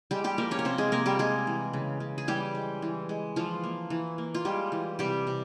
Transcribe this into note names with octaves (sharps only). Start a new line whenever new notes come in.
G3 G#3 G4
G3 G4
F3 A#3 A#4
C#4 C#5
A#4
C3 C4 C5
G#3 G#4
C3 A#3 A#4
G3 G4
G3 G#3 G#4
E3
C#3
C#3
G#4
E3 G3 G4
G#3
E3
G#3
E3 F3 F4
A#3
E3
A#3
F4
G3 G#3 G4
E3
C3 G3 G4
C3